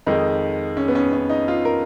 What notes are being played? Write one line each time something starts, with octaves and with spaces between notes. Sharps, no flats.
F2 D#3 G#3 D#4
C#4
B3
C#4
C#4
D#4
F4
A#4